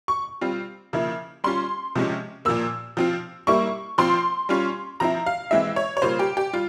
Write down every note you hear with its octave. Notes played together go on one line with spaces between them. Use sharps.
C#6
G3 C4 F4
C#3 F3 A#3 E4
G3 C#4 F4 C6
C3 F3 G#3 C#4
A#2 F3 A#3 E6
F3 C4 F4
G3 A#3 E4 C#6
F3 C4 F4 C6
G3 C#4 F4
F3 C4 E4 A#5
F5
E3 G#3 C4 E4 E5
C#5
C#5
C#3 G3 A#3 F4 C5
G4
G4
G3 F4